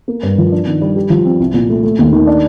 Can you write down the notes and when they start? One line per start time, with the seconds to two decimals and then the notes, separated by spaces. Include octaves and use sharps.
0.08 A#3
0.23 G2
0.38 F3
0.52 D4
0.67 D#3
0.82 G3
0.96 G4
1.10 F3
1.25 C4
1.40 C2
1.54 A#2
1.69 A3
1.83 A3
1.99 D#2
2.13 D#3
2.27 D4